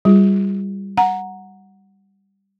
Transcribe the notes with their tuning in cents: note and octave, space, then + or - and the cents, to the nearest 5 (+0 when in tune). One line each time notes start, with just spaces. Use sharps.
G3 +0 F4 +0 G#4 +0
F#5 -5 A#5 +0